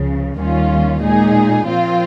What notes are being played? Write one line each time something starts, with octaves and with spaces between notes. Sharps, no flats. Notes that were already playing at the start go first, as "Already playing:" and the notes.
Already playing: C#2 C#3 F3
D#2 D#3 G3 C#4 F4
A#2 G#3 D#4 G#4
A#2 F3 C4 F4